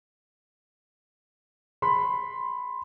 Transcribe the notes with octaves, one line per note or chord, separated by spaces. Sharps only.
B5 C6